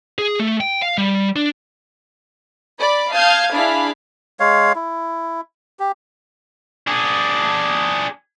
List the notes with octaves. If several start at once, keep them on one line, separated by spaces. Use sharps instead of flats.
G#4
A3
G5
F5
G3
D4
D5 B5
F5 A5 D#6 F6 G6 G#6
D4 E4 G#4 F5 B5
G#3 C#5 F5
E4
G4
D4 G#4